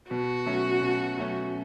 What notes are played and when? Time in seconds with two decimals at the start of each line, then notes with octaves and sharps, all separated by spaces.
0.11 B2 F#4
0.46 F#3 A3 C#4
0.82 B2
1.17 F#3 A3 C#4